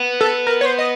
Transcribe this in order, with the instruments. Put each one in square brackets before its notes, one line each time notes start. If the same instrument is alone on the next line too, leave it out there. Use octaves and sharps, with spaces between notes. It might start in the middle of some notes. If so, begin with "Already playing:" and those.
Already playing: [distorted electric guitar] B3
[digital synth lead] A4
A#4
C#5
C5
D#5